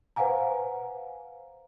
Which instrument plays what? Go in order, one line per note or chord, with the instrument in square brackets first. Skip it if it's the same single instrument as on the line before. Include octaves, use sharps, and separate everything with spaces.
[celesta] B4 C5 F5 F#5 G#5 A#5